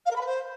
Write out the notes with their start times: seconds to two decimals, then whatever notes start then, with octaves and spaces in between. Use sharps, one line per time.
0.05 F5
0.10 A#4
0.15 B5
0.20 B4
0.25 C5